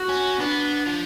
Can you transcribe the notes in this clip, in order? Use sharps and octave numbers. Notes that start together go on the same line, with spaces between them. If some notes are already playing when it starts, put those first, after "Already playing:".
Already playing: F#4
C#4
B3 D4
F3